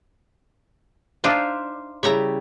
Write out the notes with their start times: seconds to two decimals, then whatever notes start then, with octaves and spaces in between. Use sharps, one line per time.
1.24 D4 D#4 F4 C5 E5 F5
2.03 C#3 G3 E4 C#5 E5 A#5